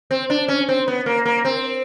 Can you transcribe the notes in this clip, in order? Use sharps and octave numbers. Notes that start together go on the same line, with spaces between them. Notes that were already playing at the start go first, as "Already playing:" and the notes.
C4
D4
C#4
C4
B3
A#3
A#3
C4